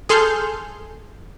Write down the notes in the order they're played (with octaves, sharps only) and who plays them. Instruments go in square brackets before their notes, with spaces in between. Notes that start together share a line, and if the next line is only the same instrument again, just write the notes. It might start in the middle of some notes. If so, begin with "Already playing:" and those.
[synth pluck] G#4 A4 C6 F6 G6